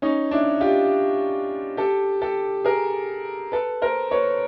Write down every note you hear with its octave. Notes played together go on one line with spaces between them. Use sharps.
C#4 D#4
D4 E4
F4 G4
G4 A4
G4 A4
G#4 A#4
A4 B4
A#4 C5
B4 C#5